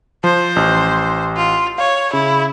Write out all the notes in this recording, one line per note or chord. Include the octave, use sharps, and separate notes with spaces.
F3 C5
A1 G6
F4
C#5 F5
C#3 E4